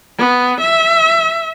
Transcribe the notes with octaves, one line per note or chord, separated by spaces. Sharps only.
B3
E5